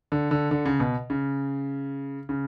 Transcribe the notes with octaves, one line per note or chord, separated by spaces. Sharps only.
D3
D3
D3
C#3
B2
C#3
C#3